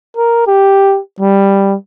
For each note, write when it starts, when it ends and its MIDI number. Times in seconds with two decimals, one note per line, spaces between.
0.16 0.45 70
0.47 1.00 67
1.20 1.75 55